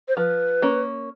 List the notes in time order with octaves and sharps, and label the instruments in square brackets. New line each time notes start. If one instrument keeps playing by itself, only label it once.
[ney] C5
[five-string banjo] F3 [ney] B4
[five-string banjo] A#3 C#4